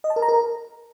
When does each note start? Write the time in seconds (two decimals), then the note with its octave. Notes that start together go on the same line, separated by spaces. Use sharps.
0.04 D#5
0.10 A5
0.16 A#4
0.22 A#5
0.28 A#4